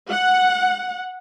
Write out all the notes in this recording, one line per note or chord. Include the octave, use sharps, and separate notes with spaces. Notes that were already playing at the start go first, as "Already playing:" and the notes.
F#5